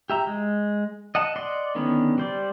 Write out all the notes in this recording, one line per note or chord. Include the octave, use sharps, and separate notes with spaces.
G4 E5 A#5
G#3
D#5 F#5 A5
D5 D#5 F#5 C6
D3 D#3 B3 C#4
G3 C5 D5